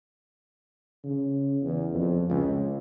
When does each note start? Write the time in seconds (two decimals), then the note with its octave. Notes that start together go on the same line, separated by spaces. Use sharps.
1.04 C#3
1.62 E2
1.94 F2
2.29 C#2